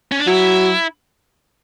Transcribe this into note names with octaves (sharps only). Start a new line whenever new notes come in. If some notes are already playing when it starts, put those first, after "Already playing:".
C#4
D4
F#3 E4